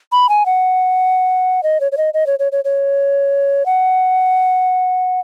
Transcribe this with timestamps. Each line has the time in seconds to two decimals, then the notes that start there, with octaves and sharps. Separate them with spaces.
0.12 B5
0.29 G#5
0.46 F#5
1.63 D#5
1.81 C#5
1.92 C#5
1.97 D#5
2.14 D#5
2.27 C#5
2.39 C#5
2.52 C#5
2.65 C#5
3.66 F#5